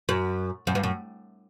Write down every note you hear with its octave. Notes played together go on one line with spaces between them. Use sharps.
F#2
F#2
G2
F#2